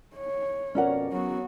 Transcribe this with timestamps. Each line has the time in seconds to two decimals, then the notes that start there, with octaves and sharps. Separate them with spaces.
0.16 C#5
0.75 F2 B2 C#4 A#4 D5 F#5
1.12 F#3 B3 F#4